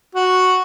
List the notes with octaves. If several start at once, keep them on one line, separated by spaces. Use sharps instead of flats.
F#4